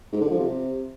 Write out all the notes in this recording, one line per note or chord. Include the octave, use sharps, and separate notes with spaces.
G#2
D3
F3
C3